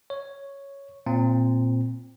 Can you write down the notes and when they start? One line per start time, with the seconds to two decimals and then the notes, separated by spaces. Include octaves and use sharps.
0.10 C#5
1.06 A#2 C4